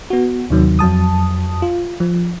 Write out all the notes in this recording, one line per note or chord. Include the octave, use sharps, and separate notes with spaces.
B3 F#4
D#2 C3 D#3 F#3
F2 F#3 A5 D#6
F4
F3